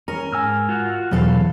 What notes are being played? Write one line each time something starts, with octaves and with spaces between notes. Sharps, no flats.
C#4 A#4
G#2 G#5 E6 F6
F4 F#4
E2 B2 E3 F#3 A4 F5